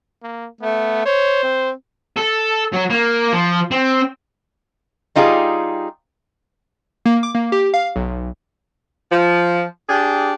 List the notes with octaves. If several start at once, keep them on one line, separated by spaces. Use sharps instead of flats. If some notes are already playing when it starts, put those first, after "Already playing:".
A#3
A3 B3
C5 C#5
C4
A4
F#3
A#3
F3
C4
G3 D#4 F4 G4 G#4
A#3
D6
A#3
G4
F5
B1
F3
D4 G4 G#4